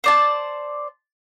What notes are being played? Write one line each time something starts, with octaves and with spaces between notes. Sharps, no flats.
C5 D5 A5